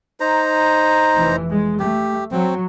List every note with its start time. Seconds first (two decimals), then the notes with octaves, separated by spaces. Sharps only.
0.20 D#4 C5 A#5
1.15 F1 E3
1.49 G#3
1.79 A3 G4
2.31 F#3 C4